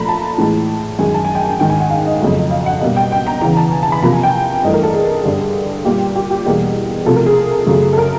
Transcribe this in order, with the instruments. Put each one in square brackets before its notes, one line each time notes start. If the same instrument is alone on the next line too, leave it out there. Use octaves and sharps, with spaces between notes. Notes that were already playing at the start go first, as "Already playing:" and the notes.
Already playing: [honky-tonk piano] A#2 F3 A3 A#5 B5
A5
A2 E3 G#3
F#2 D#3 G#3 G#5
A5
G#5
G5
G#5
G#2 D#3 G#3 G5
G#5
F#5
F5
D#5
F2 C#3 F#3 A3
F5
F#5
B2 G3 A#3
G5
G5
A#5
E2 C#3 E3 A#5
A5
G#5
A5
B5
C3 F3 A#3 A#5
G#5
G5
G2 E3 A3 D#5
A#4
A4
G#4
G2 D3 G3
A#2 G3 A#3 G4
G4
G4
E2 B2 G3 A#3 G#4
C3 F3 A3 A4
A#4
G#4
F#2 C#3 F#3 A3
A4
A#4